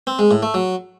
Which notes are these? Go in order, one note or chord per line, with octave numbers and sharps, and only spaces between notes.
C4
G#3
A2
A3
F#3